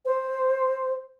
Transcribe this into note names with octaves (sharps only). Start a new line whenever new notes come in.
C5